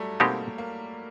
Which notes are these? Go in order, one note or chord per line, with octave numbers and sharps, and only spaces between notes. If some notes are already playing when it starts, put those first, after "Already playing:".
Already playing: F#3 G3 A3
B2 G#3 A#3 C4 D#4 G4
A#3